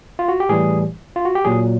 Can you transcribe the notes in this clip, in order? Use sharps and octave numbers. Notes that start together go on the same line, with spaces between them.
F4
F#4
G4
A2 E3 G3 G#4
F4
F#4
G4
A#2 F#3 G#4